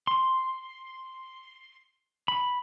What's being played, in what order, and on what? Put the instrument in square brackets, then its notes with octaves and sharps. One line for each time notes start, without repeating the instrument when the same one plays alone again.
[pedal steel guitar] C6
B5